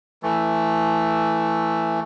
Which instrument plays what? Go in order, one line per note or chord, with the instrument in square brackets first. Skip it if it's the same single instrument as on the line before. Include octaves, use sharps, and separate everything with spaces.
[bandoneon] E3 A3